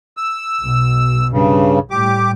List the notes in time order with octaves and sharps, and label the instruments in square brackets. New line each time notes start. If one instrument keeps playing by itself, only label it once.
[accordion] E6
[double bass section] B1 B2
[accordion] G2 C#3
[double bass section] A2 G3 [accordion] G4 D6